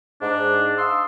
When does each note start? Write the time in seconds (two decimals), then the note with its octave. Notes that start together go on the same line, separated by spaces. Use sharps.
0.22 G#2 D4
0.78 F5 C6 D#6 E6